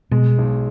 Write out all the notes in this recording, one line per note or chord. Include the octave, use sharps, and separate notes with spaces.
B2 G#3
B1